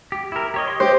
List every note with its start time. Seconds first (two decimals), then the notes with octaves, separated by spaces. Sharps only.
0.12 G4
0.32 E4 A#4
0.54 G4 C#5 D#5
0.68 D#5 C6
0.80 G4 C5